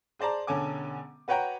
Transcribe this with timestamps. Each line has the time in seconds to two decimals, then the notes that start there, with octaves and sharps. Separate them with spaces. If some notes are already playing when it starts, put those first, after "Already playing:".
0.19 G#4 C5 D5 A5 A#5
0.47 E1 D3 C#4 A4 G#5 D6
1.28 F#4 B4 C#5 F#5 G5 A#5